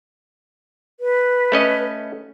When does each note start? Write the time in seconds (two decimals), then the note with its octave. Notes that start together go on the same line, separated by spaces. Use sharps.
1.00 B4
1.52 A3 C#4 D#5